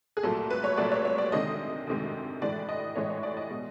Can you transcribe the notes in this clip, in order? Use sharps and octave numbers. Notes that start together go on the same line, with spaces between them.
G#4
C2 A#2 F#3 A3 A4
A4
B4
C#5
C2 A#2 F#3 A3 D5
C#5
C#5
D5
D2 C3 D#3 G#3 D#5
D2 C3 D#3 G#3
A2 E3 G#3 D5
D#5
A2 E3 G#3 C#5
C#5
D5
D#5
B2 G#3 B3